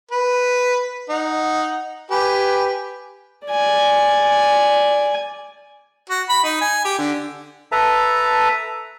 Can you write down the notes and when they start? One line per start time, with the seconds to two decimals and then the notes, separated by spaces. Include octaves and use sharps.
0.11 B4
1.10 D#4 F#5
2.11 G4 B4 G#5
3.47 D5 G#5
6.10 F#4
6.29 B5
6.44 D#4
6.61 G#5
6.85 G4
6.99 D3
7.72 A4 B4 E5 A5 A#5